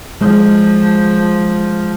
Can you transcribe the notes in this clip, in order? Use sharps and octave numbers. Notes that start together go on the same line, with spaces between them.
F3 G#3